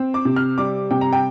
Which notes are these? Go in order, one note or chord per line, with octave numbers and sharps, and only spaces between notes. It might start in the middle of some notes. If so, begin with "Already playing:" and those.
Already playing: C4
D6
C3
F6
G3 D6
C3 G5
A#5
G5